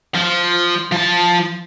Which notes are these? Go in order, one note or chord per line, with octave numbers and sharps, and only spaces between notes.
F3
F3 A5